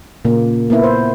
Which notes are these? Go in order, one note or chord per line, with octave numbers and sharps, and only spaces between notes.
A#2 C#3 A#3
A#3 B3 E4
C5